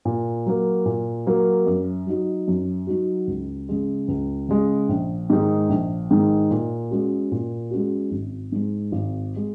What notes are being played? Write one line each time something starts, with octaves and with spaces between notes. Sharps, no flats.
A#2
F#3 A#3
A#2
F#3 A#3
F#2
F#3 D#4 F#4
F#2
F#3 D#4 F#4
C#2
C#3 G#3
C#2
C#3 G#3
A#1
G#2 D#3 G#3 D#4
A#1
G#2 D#3 G#3 D#4
A#2
G#3 C#4 F#4
A#2
G#3 C#4 F#4
G#1
G#2 G#3
G#1
G#3